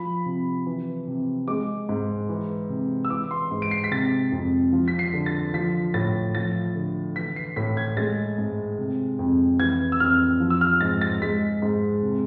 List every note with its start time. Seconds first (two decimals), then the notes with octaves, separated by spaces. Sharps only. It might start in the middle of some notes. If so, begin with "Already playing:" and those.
Already playing: F3 B5
0.26 C3
0.66 E3
1.07 C3
1.48 G#3 D6
1.89 G#2
2.29 E3
2.69 C3
3.05 E6
3.10 E3 D6
3.31 C6
3.51 G#2
3.62 D7
3.71 C7
3.84 B6
3.91 C3 A6
4.32 F2
4.73 F3
4.88 B6
4.99 C7
5.13 D3
5.26 A6
5.54 F3 B6
5.94 A2 A6
6.35 F3 A6
6.76 D3
7.16 E3 B6
7.36 C7
7.56 A2 B6
7.77 G#6
7.97 G#3 A6
8.38 G#2
8.78 C3
9.19 F2
9.59 E3 G#6
9.92 E6
10.00 F2 F6
10.40 F3
10.50 E6
10.61 F6
10.81 G#2 A6
11.01 A6
11.22 G#3 B6
11.62 G#2
12.03 C3